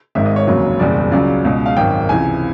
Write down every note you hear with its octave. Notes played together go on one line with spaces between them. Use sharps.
G#1 G#2 D#3 G#3 E5
D#5
C#5
F1 D#2 C#3 F#3
F#1 E2 B2 G3 D5
C#2 C#3 F#3 D5
C#2 B2 G#3
F5
G#1 F#2 D#3 G5
C#2 C3 E3 G#5